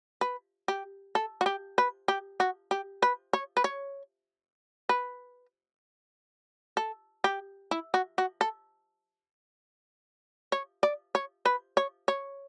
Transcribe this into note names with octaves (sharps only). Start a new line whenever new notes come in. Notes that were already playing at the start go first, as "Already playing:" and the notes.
B4
G4
A4
F#4
G4
B4
G4
F#4
G4
B4
C#5
B4
C#5
B4
A4
G4
E4
F#4
F#4
A4
C#5
D5
C#5
B4
C#5
C#5